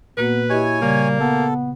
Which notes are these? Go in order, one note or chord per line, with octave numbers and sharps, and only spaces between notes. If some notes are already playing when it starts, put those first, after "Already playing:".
A#2 A#3 B3 F#4 B4
E4 G4 C#5 D#5 G#5
C#3 G3 A#3
B3 A4